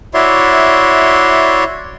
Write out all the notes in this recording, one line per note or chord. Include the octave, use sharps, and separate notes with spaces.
E4 F#4 C#5 D5 E5 C6